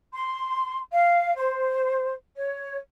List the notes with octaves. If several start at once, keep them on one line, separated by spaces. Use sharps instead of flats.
C6
F5
C5
C#5